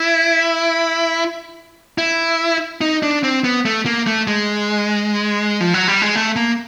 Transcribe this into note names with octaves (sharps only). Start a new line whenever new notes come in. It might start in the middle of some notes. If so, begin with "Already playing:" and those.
Already playing: E4
E4
D#4
D4
C4
B3
A3
A#3
A3
G#3
F3
F#3
G3
G#3
A3
A#3